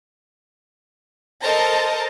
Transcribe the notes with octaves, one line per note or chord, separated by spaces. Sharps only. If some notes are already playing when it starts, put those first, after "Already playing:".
A4 A#4 C5 D#5 A5 A#5